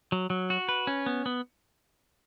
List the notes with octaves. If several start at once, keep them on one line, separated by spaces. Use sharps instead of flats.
F#3
F#3
F#4
B4
C#4
B3
B3